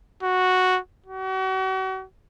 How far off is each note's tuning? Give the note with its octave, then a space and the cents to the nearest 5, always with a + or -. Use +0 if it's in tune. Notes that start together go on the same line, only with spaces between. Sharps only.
F#4 -5
F#4 +40